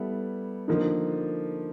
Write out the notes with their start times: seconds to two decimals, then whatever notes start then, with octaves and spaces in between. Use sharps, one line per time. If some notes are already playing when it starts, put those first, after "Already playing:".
Already playing: G3 B3 E4 A4
0.68 D3 F3 A#3 D#4